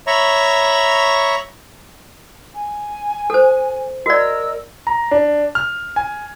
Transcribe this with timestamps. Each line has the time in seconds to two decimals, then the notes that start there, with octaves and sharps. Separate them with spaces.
0.07 C#5 E5 A#5 B5 C#6
2.54 G#5
3.30 A4 C5
4.06 F#4 A#4 D5 D#5 E6
4.87 A#5
5.11 D4
5.55 F6
5.96 G#5